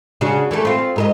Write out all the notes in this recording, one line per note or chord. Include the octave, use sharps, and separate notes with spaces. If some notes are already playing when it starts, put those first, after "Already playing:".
C#3 D4 F#4
E3 A3 A4
C4 F4
G#2 A#4 D#5